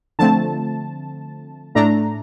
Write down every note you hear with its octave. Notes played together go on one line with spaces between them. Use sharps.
D3 F3 A3 C4 A5
A2 A3 D4 A#5